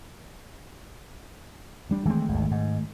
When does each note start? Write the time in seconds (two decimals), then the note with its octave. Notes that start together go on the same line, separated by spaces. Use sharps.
1.90 A1 G3 D4
2.06 D#3 E3 G#3 A3 C4
2.29 G#1 D2
2.51 G#2